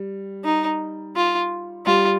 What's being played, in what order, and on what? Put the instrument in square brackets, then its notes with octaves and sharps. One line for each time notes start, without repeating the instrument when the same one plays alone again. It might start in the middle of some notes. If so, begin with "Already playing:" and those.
Already playing: [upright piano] G3
[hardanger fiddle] D#4
F4
[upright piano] G3 [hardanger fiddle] F4